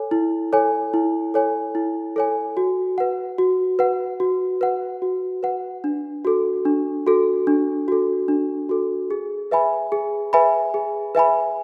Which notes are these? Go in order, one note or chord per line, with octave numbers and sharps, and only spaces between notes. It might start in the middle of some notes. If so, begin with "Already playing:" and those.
Already playing: A4 C#5 G#5
E4
A4 C#5 G#5
E4
A4 C#5 G#5
E4
A4 C#5 G#5
F#4
B4 F#5
F#4
B4 F#5
F#4
B4 F#5
F#4
B4 F#5
D4
F#4 A4
D4
F#4 A4
D4
F#4 A4
D4
F#4 A4
G#4
B4 E5 G#5 B5
G#4
B4 E5 G#5 B5
G#4
B4 E5 G#5 B5